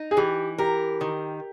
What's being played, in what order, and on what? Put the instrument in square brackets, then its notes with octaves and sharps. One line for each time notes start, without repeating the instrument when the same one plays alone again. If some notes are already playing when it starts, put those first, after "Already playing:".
Already playing: [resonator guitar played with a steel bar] D#4
[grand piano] G#4
[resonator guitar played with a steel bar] E3 [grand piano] G4
[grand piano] G4 [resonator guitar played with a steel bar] A#4
[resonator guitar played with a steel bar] D#3